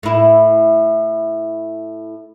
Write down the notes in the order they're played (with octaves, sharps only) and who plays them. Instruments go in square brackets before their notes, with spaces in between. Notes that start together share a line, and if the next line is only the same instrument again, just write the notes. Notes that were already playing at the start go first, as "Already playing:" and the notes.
[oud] A2 E4